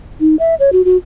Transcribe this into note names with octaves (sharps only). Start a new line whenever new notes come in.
D#4
E5
C#5
F#4
F#4